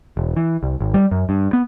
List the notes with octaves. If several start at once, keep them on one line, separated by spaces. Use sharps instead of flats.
E1
E3
C2
G#1
G3
F#2
G2
B3